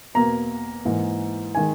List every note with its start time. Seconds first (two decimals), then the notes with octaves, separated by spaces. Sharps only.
0.14 E2 B2 A#3 A#5
0.85 G#2 E3 A#3
1.55 D#3 G#3 G#5